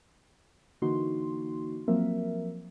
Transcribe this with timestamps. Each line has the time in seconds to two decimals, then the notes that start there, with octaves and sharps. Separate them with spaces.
0.82 D3 E3 A#3 D#4 F#4 C6
1.88 F3 F#3 A#3 C4 A#4 E5